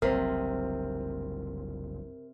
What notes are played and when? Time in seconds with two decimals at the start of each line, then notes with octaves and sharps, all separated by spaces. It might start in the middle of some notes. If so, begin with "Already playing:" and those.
0.02 F#1 C2 C3 A#4